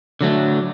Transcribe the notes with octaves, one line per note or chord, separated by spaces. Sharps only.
D3 F#3 A3